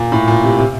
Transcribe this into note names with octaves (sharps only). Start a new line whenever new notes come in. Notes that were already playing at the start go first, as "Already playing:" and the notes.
Already playing: A#2
A2
A#2
C3
C3